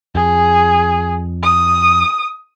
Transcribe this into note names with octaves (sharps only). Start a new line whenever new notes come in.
F2 G#4
D#6